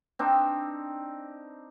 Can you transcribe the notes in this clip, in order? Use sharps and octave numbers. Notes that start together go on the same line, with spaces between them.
C4 D4 D#4